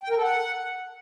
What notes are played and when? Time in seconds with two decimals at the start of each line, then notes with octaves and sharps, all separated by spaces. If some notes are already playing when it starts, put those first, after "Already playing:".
0.04 G5
0.10 A#4
0.17 A4
0.23 F#5